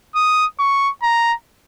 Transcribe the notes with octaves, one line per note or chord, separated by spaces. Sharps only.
D#6
C#6
A#5